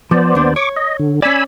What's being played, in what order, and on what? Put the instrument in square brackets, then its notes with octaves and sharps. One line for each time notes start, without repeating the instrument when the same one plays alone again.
[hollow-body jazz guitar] F3 [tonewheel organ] B3 C5 D5
[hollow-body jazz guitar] D#2 D4
[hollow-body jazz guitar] C#5 [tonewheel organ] C#6 D6
[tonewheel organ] D#5
D3
[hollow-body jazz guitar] C#4 D5 [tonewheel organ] G#5 B5 E6